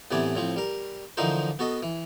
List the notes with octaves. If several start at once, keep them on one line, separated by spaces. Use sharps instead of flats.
A2 C3 E3 B3 D5 G#5
A2 F3 C4
G3 A#4
D3 E3 F3 D#4 A#4 C5
B3 F#4 A4 D#5
E3